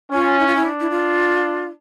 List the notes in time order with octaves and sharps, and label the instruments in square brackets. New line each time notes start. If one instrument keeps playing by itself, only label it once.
[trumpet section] C#4 [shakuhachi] F4
[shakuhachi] E4
F4
E4
[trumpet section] D4
[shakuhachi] E4
F4